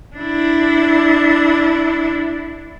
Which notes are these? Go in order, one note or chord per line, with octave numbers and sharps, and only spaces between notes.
D4 E4